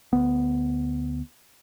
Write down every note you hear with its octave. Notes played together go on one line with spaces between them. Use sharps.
D2 B3